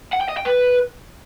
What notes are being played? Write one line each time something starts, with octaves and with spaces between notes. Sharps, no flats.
F#5
G5
D#5
G5
B4